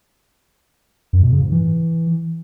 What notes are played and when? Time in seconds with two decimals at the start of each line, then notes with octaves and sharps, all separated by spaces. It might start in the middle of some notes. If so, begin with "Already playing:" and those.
1.13 F#2
1.23 B2
1.32 C#3
1.42 G#2
1.52 E3